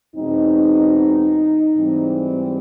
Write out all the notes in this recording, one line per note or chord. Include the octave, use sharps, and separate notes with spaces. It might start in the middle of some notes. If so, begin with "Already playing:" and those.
E2 B2 G#3 C4 D#4
G#2 E3 G3 C4